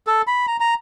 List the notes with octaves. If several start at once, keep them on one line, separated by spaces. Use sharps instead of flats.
A4
B5
A#5
A#5